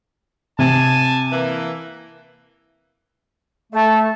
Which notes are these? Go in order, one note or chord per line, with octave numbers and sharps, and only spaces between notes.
C3 G#5 A5
E3 A#3
A3 A4